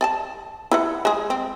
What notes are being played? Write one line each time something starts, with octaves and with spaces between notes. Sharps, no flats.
D5 G#5 A5
E4 B4 F#5
G#3 G#4
C4